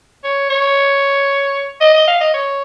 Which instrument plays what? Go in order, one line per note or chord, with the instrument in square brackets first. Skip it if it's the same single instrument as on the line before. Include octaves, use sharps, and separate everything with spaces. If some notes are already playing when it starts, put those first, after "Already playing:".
[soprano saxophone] C#5
C#5
D#5
D#5
F5
D#5
C#5